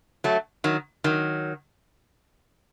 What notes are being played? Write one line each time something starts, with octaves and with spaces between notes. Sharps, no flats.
F#3 A3
D#3 F#3
D#3 F#3